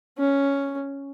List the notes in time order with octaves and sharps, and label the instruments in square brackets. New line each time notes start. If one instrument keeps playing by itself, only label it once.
[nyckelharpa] C#4